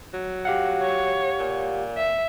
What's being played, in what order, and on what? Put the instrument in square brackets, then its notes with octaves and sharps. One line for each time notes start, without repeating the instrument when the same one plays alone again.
[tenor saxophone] F#3
[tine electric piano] G4 F5 F#5
[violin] C#5
[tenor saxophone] A#2
[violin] E5